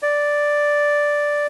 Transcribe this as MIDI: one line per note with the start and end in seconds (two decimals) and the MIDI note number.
0.03 1.47 74